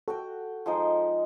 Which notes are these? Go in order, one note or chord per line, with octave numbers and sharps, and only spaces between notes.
F#4 A4 F#5 G5
F3 G#3 D#4